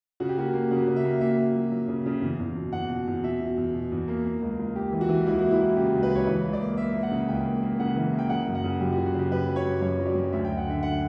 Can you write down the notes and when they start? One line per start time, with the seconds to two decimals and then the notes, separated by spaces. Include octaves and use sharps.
0.20 C#3 F#4
0.29 G4
0.37 A#3 F#4
0.54 A#3
0.71 C#3 F#4
0.88 C#3
0.96 E5
1.04 A#3
1.21 A#3 E5
1.38 A#3
1.55 F#3
1.72 F#3
1.88 C#3
2.06 C#3
2.22 E2
2.39 E2
2.56 B2
2.72 E2 F#5
2.90 B2
3.07 E2
3.23 B2 E5
3.40 B2
3.57 E2
3.74 B2
3.92 E2
4.08 A#3
4.25 A#3
4.42 C#2
4.59 C#2
4.76 A#3 G4
4.92 E3
5.01 F#4
5.09 E3
5.26 C#2 E4
5.39 F#4
5.43 A#3
5.51 E4
5.60 A#3
5.76 C#3 G4
5.94 C#2
6.03 B4
6.11 C#2 C#5
6.27 E3 B4
6.44 C#2
6.53 D5
6.61 A#3
6.77 A#3 E5
6.95 A#3
7.03 F#5
7.11 C#3
7.29 C#2 G5
7.45 A#3
7.63 A#3
7.79 C#3 F#5
7.96 E3
8.13 A#3
8.19 G5
8.29 C#3 F#5
8.46 F#2
8.55 F#5
8.64 C#3
8.80 F#2 G4
8.93 F#4
8.98 C#3
9.06 F#4
9.14 C#3 G4
9.31 F#2 B4
9.48 F#2
9.56 C#5
9.65 F#2
9.82 F#2 C#5
9.99 F#3
10.06 D5
10.15 F#2
10.32 D2 E5
10.45 G5
10.49 D2
10.58 F#5
10.67 D3 E5
10.83 D3 F#5